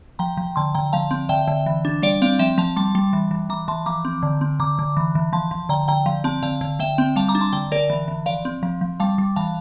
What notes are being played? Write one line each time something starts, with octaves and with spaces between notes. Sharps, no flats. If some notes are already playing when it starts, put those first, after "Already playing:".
F3 G5 A#5
F3
D3 A5 C6
D3 G5 A#5
F3 F5 A5
C4
D3 E5 G5
D3
E3
D4
G3 D5 F5
C4 D5 F5
F3 E5 G5
F3 F5 A5
G3 A5 C6
G3
E3
E3
E3 A#5 D6
E3 A5 C6
F3 A#5 D6
C4
D3
C4
D3 A#5 D6
D3
E3
E3
F3 A5 C6
F3
D3 G5 A#5
D3 G5 A#5
F3
C4 A5 C6
D3 F5 A5
D3
D3 E5 G5
C4
G3 F5 A5
A#5 D6
D4
A5 C6
D3 G5 A#5
D3 A#4 D5
E3
E3
F3 D5 F5
C4
F3
F3
G3 F5 A5
G3
E3 F5 A5